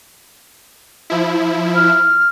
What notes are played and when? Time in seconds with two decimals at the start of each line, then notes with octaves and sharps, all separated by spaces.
1.10 F3 E4
1.75 F6